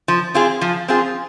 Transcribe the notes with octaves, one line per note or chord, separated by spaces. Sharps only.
F3
C4 F4 G#4
F3
C4 F4 G#4